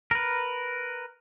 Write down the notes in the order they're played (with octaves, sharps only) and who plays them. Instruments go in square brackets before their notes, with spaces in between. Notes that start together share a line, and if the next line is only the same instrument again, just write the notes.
[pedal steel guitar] A#4 B4